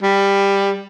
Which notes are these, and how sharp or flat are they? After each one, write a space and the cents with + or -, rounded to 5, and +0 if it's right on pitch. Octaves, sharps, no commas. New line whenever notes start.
G3 +15